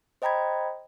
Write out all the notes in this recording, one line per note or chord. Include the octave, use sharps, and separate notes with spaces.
C5 D#5 G5 A#5 B5 G#6